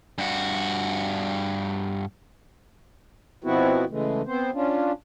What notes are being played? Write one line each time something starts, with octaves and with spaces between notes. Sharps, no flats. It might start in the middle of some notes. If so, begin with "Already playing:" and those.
G2 F#4
B2 F3 B3 C4 E4 F#4
C#3 E3 G#3 A3
B3 C4 C5
C#4 D4 F4